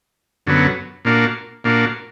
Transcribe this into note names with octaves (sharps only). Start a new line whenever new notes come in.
F#2 D3 F#3 B3
A#2 A#3 D4 F#4
A#2 A#3 D4 F#4